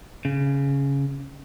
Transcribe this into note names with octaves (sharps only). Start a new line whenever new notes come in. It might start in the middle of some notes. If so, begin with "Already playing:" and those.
C#3